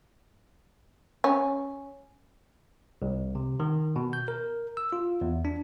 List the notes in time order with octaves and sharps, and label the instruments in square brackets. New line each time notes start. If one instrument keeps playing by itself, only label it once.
[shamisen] C#4
[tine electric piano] C2
C3
D#3
B2
G6
A#4
E6
F4
E2
D4